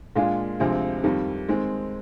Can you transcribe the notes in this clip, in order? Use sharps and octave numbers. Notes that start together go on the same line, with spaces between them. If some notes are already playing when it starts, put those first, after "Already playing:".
A#2 G#3 D4 F4
D2 C3 F3 G#3 C4
F2 D#3 G3
D#3 G#3 C4